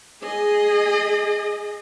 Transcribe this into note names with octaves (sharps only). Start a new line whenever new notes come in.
G#4 D#5